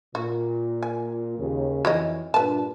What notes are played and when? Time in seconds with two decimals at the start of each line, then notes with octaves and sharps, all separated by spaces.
0.15 A#2 F#4
0.83 G#5
1.38 D#2 C#3
1.85 F2 E3 F#4 C#5 D#5
2.34 G2 A#2 D4 B4 A5